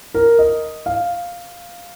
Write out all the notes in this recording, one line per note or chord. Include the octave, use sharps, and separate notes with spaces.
A#4
D#5
F5